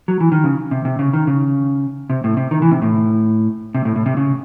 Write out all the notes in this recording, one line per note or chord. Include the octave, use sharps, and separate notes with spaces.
F#3
E3
D#3
C#3
C3
C3
C#3
D#3
C#3
C3
A2
C3
D#3
E3
C3
A2
C3
A2
A2
C3
C#3